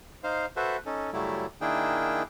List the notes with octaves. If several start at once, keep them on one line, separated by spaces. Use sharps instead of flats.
D#4 C5 F5
F#4 A4 B4 C5 E5
C#4 D#4 A4
F#2 C#3 F#3 G3 A3 E4
D#3 A#3 D4 E4 G#4 G5